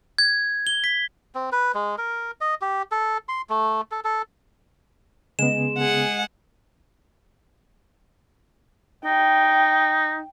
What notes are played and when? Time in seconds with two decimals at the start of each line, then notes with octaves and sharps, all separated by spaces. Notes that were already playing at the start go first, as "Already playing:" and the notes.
0.18 G#6
0.67 G7
0.84 B6
1.34 C4
1.52 B4
1.75 G#3
1.98 A#4
2.41 D#5
2.61 G4
2.92 A4
3.29 C6
3.49 A3
3.91 A4
4.04 A4
5.39 C#3 G#3 B3 E7
5.78 G#4 F#5
9.05 D#4 G5